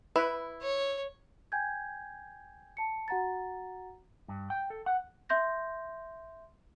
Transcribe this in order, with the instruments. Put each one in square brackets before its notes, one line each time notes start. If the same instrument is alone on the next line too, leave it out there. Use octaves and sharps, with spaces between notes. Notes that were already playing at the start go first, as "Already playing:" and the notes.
[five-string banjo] E4 [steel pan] B4
[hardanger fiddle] C#5
[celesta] G5 G#5 G6 G#6
A5 C#7
F#4 F#5 A#5 A6
[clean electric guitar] G2
G5
A4
F#5
[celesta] E5 C6 G6 A#6